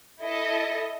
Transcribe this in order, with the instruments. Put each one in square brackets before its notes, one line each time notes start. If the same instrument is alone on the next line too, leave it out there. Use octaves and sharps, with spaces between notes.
[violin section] E4 A4 D#5